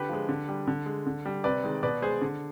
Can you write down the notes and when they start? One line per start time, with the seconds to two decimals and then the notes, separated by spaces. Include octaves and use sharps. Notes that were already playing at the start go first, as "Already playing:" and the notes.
Already playing: D3 G4 B4
0.09 F3 G#3
0.29 D3
0.49 G3
0.67 D3
0.86 G#3
1.06 D3
1.25 G3
1.44 C3 B4 D5
1.64 D#3 G#3
1.83 B2 B4 D5
2.02 G#3 G#4 C5
2.21 D3